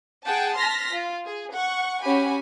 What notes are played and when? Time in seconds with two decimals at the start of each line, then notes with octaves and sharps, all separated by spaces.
0.24 G#4 F#5 G5 A5
0.55 A5 C6 F6 A#6 B6
0.92 F4
1.25 G#4
1.54 F#5 C#6
2.03 C#4 F#4 G4 G#5 B5